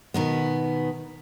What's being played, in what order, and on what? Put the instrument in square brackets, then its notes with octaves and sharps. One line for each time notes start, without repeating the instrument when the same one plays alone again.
[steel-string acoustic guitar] B2 D#3 B3